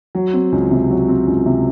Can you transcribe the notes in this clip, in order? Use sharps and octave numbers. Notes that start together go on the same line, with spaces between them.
F#3
C4
C#2
C3
F#3
C4
C#2
C3